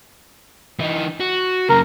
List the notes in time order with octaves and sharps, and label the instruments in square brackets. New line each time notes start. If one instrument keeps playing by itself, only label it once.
[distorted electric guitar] E3 D#4
F#4
[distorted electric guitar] F#2 C#3 [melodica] A#4